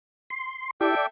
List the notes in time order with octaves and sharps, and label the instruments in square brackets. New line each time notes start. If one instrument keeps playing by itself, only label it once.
[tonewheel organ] C6
[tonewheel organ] E4 G4 D5 [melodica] A4 E5 G5
[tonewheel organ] D5